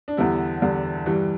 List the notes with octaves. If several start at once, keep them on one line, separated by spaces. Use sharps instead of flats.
D4
E2 D3 G3 B3 E4
E2 D3 G3
G2 E3 G3